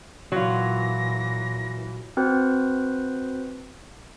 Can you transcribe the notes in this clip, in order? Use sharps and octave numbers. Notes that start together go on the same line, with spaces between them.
A#2 E3 F#3 F4 A#6
C4 F#4 B4 C5